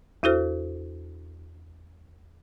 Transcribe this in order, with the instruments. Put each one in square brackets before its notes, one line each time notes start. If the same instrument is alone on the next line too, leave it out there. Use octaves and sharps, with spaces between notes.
[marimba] E2 E4 F#4 A4 C5 F6